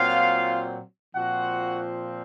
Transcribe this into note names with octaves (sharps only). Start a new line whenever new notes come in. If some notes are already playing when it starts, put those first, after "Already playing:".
Already playing: A#2 F#3 C4 F4 F5
A#2 F3 C4 F#4 F#5